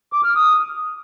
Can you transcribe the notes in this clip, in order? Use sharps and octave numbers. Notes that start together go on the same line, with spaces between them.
D6
F6
D#6